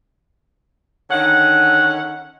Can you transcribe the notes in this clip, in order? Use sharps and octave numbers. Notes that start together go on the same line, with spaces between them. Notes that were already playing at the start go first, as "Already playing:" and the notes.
D3 D#3 C#4 F#5